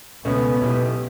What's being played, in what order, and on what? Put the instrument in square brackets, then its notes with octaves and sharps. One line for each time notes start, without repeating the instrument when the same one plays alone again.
[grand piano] C#2 B2 A3 C#4 [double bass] B3
[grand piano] B1 B2 A3 E4 G4